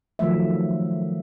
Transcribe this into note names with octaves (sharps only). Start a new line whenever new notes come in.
D#3 F3 F#3 A3 E5